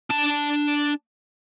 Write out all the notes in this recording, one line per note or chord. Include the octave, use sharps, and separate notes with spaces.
D4 A5